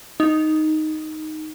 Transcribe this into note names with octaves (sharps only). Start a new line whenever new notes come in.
D#4